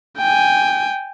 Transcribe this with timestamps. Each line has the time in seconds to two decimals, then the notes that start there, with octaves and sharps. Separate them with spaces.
0.18 G5 G#5